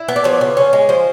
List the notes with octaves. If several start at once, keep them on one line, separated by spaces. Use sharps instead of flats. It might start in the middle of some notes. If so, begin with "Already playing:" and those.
Already playing: E4
B3
D5
F3 C#5
C#3
C#4
G#3
F3 C5